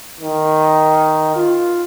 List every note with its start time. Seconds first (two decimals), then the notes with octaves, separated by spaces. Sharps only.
0.21 D#3
1.36 F4